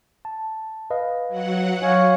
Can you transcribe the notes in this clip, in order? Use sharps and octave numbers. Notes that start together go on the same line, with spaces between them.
A5
B4 D#5 F5
F#3 F#5
C#5 F5 G#5